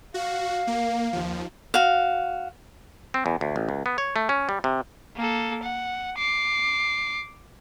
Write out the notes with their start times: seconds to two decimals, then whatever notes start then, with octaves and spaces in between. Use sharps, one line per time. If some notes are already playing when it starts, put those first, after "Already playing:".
0.14 F#4 F5
0.67 A#3
1.13 D#2 F3
1.74 F#4 F5
3.14 C4
3.26 E2
3.41 D2
3.56 A1
3.69 C#2
3.86 B3
3.98 C#5
4.16 A3
4.29 C#4
4.49 G3
4.64 C3
5.16 A#3 A4
5.63 F#5
6.18 D6 C7